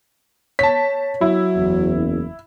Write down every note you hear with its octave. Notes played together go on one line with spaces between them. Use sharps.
C#5 A5 B6
F#3 E4
F#1 E2